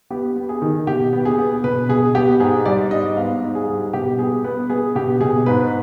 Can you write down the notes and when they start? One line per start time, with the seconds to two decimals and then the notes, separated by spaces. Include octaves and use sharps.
0.10 B3 G4
0.36 B3
0.49 G#4
0.62 D#3
0.87 B2 G4
1.13 B3
1.25 G#4
1.38 B3
1.64 B2 B4
1.89 B2 G#4
2.15 B3 G4
2.40 G#2 G#4
2.65 G3 D5
2.91 G#2 D#5
3.17 B3 F5
3.42 G#2
3.55 G#4
3.68 G3
3.93 B2 G4
4.18 B3 G#4
4.44 B3 B4
4.70 B3 G#4
4.95 B2 G4
5.21 B2 G#4
5.46 G#2 B4